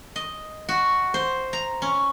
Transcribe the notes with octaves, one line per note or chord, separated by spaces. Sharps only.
D#5
F#4
C5
A#5
C#4